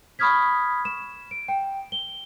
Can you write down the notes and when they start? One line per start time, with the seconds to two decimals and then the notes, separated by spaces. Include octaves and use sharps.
0.19 B5 C#6 D#6 F6 G#6 B6
0.85 E7
1.31 D7
1.48 G5
1.92 G7